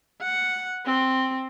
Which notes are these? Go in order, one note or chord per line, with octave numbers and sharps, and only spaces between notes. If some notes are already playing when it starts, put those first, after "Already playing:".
F#5
C4